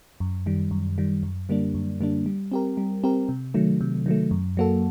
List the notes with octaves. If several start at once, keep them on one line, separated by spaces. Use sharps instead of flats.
F#2
D#3 G3
F#2
D#3 G3
F#2
D3 G3 A#3 D4
F#2
D3 G3 A#3 D4
G3
C4 G4 A#4
G3
C4 G4 A#4
C3
D#3 F#3 A3
C3
D#3 F#3 A3
F#2
F#3 A#3 F#4 A4